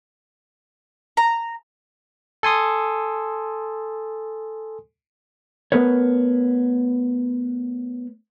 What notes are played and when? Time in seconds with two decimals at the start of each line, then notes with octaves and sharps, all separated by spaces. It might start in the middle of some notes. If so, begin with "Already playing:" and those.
1.17 A#5
2.43 A4 G#5 C6 D#6
5.72 A3 B3 A#4 B4 C#5